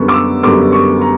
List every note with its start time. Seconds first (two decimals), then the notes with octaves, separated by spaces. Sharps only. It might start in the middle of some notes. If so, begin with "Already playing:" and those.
Already playing: F#2 D3 G3 B3 C#6
0.08 D6
0.14 E6
0.43 F#2 D3 G3 B3 D6
0.72 C#6
1.01 A#5